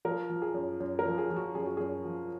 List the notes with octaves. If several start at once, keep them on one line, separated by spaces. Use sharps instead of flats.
F3 A#4
F3
G#4
F#2
F#2
A#4
F3
G#4
F3
F#4
F#2 G#4
F#4
F#2 G#4
F3